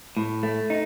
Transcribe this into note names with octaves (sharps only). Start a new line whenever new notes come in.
A2
A3
D#4